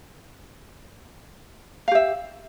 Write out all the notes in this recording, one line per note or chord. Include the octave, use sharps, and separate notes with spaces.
G4 E5 F5